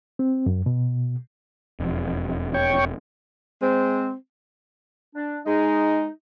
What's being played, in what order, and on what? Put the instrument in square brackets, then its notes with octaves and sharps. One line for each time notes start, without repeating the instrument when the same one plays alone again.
[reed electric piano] C4
F#2
B2
[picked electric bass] E1 F2
[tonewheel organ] C#5 G5 C#6
[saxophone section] G#3 C4
[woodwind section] D4
[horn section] G#3 [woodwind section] D#4